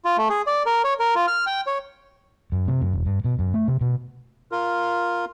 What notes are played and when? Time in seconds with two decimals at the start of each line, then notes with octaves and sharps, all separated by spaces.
0.05 F4
0.17 A3
0.30 G#4
0.47 D5
0.66 A#4
0.84 C#5
1.00 A#4
1.15 F4
1.27 F6
1.47 G5
1.67 C#5
2.52 F#2
2.68 C3
2.81 F#2
2.93 E1
3.06 G2
3.25 B2
3.39 F#2
3.54 A3
3.68 C3
3.81 B2
4.52 F4 A#4